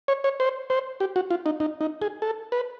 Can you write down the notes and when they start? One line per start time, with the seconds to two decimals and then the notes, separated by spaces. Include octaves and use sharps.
0.08 C#5
0.24 C#5
0.40 C5
0.70 C5
1.00 G4
1.16 F#4
1.31 F4
1.46 D#4
1.60 D#4
1.81 D#4
2.02 G#4
2.22 A4
2.52 B4